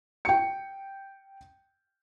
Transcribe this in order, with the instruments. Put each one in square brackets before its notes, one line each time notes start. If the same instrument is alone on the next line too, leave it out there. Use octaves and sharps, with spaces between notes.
[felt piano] G5 C#7